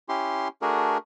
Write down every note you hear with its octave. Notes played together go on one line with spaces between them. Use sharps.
C#4 E4 G4 C6
A3 D4 F#4 G#4 A#4